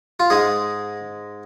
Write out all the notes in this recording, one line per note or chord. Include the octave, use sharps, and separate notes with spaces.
F4
G#2 G#3 G#4